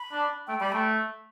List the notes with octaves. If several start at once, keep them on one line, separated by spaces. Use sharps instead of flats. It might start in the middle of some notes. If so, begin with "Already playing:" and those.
Already playing: B5
D4
A3 G5
G3 B5
A3 G5